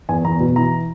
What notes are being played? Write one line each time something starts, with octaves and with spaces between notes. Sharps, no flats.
E2 G#5
E2 A#5
B2
E3 A#5